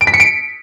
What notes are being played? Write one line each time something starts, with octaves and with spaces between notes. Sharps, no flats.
D7
B6
C#7
D7